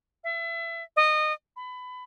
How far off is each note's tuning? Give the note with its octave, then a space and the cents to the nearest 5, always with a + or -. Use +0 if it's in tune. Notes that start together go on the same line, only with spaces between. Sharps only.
E5 +25
D#5 -20
B5 +25